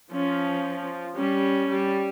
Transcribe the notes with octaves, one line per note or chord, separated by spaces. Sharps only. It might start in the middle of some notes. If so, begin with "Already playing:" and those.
F3 C#4
G3 C#4
G3